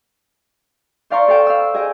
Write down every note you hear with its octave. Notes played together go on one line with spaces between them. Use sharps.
C5 D5 F5 A#5 C6 C#6
A4 F5 G5
F5 E6
G#4 D#5 G5